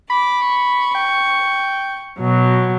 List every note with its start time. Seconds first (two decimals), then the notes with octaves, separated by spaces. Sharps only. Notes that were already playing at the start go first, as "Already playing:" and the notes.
0.10 B5 D6
0.47 C#6
0.95 G5
2.17 B2 F#3